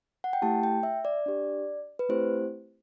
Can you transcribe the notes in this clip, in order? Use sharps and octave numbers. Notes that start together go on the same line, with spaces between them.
F#5
G5
A3 E4 G4 A5
G5
E5
D5
D4 G4
B4
A3 C4 E4 G4 C5